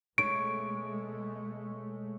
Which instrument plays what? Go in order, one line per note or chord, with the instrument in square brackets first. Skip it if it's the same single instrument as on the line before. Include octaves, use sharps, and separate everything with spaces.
[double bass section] B2 G#3 A3 [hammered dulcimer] C#5 [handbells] D7